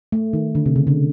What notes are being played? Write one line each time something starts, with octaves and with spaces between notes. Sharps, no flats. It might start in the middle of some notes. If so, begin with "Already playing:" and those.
A3
D#3
D3
C3
C#3
D3